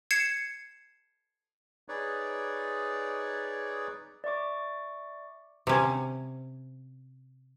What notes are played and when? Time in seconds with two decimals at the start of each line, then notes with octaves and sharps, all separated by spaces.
0.11 G#6 C7 C#7 E7
1.89 D#4 G#4 B4 C#5 D5
4.24 D5 E5 C#6 D6
5.67 C3 C#4